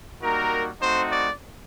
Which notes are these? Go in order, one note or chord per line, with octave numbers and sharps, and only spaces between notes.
G3 A#3 D#4 F#4 A#4
A3 C4 D#4 F#4 C5
D5